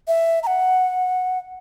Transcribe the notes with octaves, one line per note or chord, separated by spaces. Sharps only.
E5
A#5
F#5